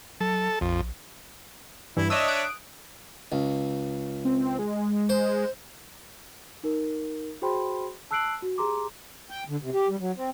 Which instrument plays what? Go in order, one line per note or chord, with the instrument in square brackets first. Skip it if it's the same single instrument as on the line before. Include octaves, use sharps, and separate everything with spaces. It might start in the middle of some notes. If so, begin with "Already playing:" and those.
[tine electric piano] F#3 [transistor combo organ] A4
[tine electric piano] A#1 [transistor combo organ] F2
[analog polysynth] G2 E3 [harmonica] E4
[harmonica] D4 C#5 E5 [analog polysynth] D#5 D#6 E6
[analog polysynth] D#6 F#6 D7
[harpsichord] C#2
[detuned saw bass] C4
G#3
[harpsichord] C5
[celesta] D#4 A#4
F#4 G#4 C5 G5 B5 C6
A5 E6 F#6 C7 D7 F#7
F#4
G4 G#4 A#5 C6 D6
[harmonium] G5
D3
C3
G4
G3
F#3
C4